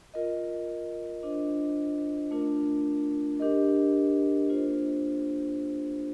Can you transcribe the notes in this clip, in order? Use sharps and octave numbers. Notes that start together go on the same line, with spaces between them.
F4 A#4 D#5
D4 F4 C5 D#5
A3 D4 F4 A#4
D4 G4 A#4 D#5
A#3 D4 F4 C5